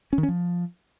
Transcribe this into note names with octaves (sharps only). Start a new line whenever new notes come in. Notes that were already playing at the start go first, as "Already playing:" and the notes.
C#4
D#3
C#4
F3